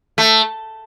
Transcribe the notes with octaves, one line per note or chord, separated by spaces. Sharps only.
A3